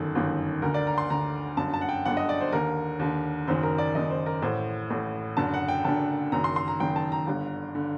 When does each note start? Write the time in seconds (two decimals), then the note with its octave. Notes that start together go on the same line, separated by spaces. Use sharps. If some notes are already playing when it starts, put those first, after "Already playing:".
Already playing: G1 F#2 D#3 A4
0.15 G1 F#2 D#3
0.62 D2 D3 A#4
0.74 D5
0.87 A#5
0.98 C6
1.10 D2 D3 A#5
1.57 G1 F#2 D3 A5
1.74 A5
1.81 F#5
1.89 G5
2.05 G1 F#2 D3 F#5
2.17 D#5
2.29 D5
2.41 C5
2.52 D#2 D3 A#4
2.99 D#2 D3
3.47 F#1 F#2 D#3 C5
3.63 A#4
3.78 D5
3.95 F#1 F#2 D#3 D#5
4.10 C5
4.26 A#4
4.42 A1 A2 C5
4.90 A1 A2
5.37 F#1 F#2 D3 A5
5.54 F#5
5.68 G5
5.84 F#1 F#2 D3 A5
6.32 F#1 F#2 D#3 A#5
6.44 C6
6.56 C6
6.68 A#5
6.80 F#1 F#2 D#3 G5
6.96 A5
7.12 A#5
7.27 G1 G2 D3
7.75 D3